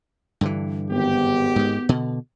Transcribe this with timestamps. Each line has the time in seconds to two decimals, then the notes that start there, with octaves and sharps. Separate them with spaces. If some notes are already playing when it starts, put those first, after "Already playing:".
0.41 G2 D3 E3
0.90 G#1 B3 G4
1.56 G#2 G#3
1.89 B2 D3